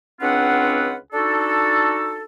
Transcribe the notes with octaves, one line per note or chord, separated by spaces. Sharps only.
C#2 C4 D4 F4 B4 F#5
D4 D#4 F#4 A4